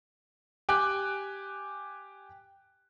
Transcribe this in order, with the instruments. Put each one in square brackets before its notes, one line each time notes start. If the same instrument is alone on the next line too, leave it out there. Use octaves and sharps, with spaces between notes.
[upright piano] G4 G5 G#5 D6 F#6